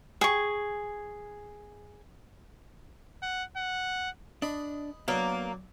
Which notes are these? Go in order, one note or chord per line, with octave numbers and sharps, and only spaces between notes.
G#4 C#6
F#5
F#5
D4 D#5 B5
F#3 A#3 B3 D4